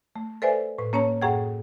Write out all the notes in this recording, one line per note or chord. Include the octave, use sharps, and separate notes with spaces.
A3
A4 B4 C5 D5 E5 G#5
A2 B4
A#3 C#4 C#5 A5 A#5
F#2 A2 G#4 F#5 G5 G#6